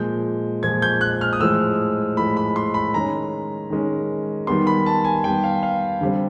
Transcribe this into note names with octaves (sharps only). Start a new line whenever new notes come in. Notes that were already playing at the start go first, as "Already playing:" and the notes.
Already playing: A#2 F3 G#3 G6
A#2 F3 G#3 G#6
G6
F#6
F6
D#6
A2 F3 G#3 E6
A2 F3 G#3 B5
B5
C6
B5
D#3 G#3 C#4 A#5
D#3 G#3 C#4
D#3 G3 B3 C6
B5
A5
G#5
D#3 G3 B3 G5
F5
F5
D3 G3 C4